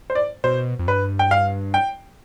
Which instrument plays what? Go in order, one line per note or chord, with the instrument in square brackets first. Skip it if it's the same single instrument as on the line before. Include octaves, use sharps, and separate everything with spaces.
[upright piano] C5
D5
[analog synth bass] B2 [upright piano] C5
[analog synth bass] F2
[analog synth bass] G2 [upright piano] B4
[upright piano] G5
F5
G5